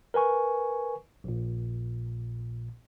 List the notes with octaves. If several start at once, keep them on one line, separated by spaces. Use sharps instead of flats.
A#4 B4 G#5 C#6
A#1 A#2